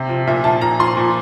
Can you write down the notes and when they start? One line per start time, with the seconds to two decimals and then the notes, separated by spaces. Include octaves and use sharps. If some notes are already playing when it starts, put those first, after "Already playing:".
Already playing: C3
0.09 F3
0.27 A#2 E5
0.44 F3 A5
0.61 A#2 A#5
0.79 F3 C6
0.97 A#2